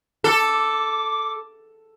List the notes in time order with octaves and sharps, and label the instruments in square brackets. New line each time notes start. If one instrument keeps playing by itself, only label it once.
[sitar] A4 [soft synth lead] D6